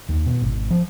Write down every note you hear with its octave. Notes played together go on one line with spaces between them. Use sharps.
D#2
B2
G#1
F3